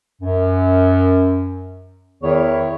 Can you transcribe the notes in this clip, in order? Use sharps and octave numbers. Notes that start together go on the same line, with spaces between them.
F#2
E2 D#3 E4 C#5